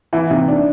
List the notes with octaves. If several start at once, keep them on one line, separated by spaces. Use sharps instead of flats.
E3 E4
C3 D#4
D4